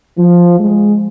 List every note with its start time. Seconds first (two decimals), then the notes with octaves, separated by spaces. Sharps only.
0.18 F3
0.59 G#3